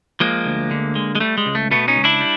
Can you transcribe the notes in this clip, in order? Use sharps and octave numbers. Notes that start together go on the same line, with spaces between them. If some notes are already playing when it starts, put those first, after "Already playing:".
F3 G#3 A#3
D2
D3
G#3
G#3
G3 A3
G#3
C#2
A3
B2 A3 B3
C#4 D#4
C#2
D4 E4
G3